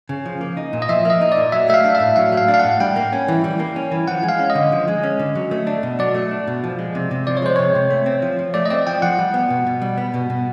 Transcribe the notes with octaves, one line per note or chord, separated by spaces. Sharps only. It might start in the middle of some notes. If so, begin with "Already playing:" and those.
C#3
F3
A#3
D#4
A#2
D#5
F3 E5
A#3 D#5
D#4
D5
A#2
F#3 E5
A3 E5
F5
D4
E5
A2
F#3 F5
A3
F5
D4
F5
A2 F#5
G3 G5
A#3
C#4
E3
G3
A#3
C#4
E3
F3 F#5
G#3
F5
C#4
D#5
D3
F3
G#3
C#4
D3
F#3
A3
D4
B2
F#3 D5
A3
D4
B2
F3
G#3
C3
C3
F3 D5
C#5
G#3 C5
C3 C#5
C3
A3
C4
F3
F3
A3 D5
D#5
C4 D5
F3 G5
F3 F#5
G3
B3
B2
B2
G3
B3
B2
B2